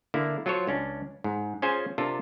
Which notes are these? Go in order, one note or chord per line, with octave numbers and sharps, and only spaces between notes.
D3 A#3 E4
F#3 F4 A4 C5 C#5
C#2 C#4 D4
G#2
C#4 F4 G#4 C5 G#5
C3 D4 F4 A4 A#4